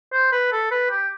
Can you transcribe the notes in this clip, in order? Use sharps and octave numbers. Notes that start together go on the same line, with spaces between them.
C5
B4
A4
B4
G4